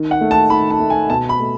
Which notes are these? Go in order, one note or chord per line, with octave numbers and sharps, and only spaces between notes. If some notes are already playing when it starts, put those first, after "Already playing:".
Already playing: D#3
F#5
A3
A5
D#3 B5
A5
A3
G#5
B2 A5
B5
A3